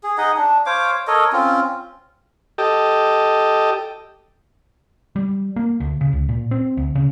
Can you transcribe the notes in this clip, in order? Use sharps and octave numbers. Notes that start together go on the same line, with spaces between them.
G#4
D#4 G#4 D#5 F#5
D4
C5 C#5 F5 D6
A4 A#4 C#5 D#5
C4 C#4 F4
G4 A4 D#5
G3
A#3
D2
C#3
C#2
A#2
C4
D2
C#3